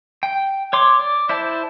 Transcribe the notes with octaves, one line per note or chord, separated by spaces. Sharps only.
G5
C#5 C6 D6
D5
E4 C5 D5 A5